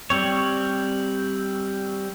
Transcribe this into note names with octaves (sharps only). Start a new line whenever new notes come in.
G3 C4 C#5